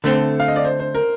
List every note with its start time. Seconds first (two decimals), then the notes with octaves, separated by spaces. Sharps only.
0.04 D3 A3 C4 A4
0.40 F5
0.48 D#5
0.56 D5
0.65 C5
0.80 C5
0.95 A#4